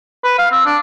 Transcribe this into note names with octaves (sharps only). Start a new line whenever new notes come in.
B4
F5
C4
D4